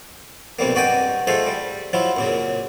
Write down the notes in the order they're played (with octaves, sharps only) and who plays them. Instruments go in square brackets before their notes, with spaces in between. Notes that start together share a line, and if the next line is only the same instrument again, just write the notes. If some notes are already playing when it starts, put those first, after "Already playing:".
[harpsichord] B1 C3 G3 A#3
G2 F#4 D5 D#5 G5 G#5
A3 F4 G#4 A4 C5 D#5
G3
F3 F#3 E4 F4
F#2 A#2 C#3